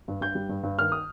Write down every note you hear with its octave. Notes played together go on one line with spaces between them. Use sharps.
G2
G2 G6
G3
G2
G2
D#3 F6
D#6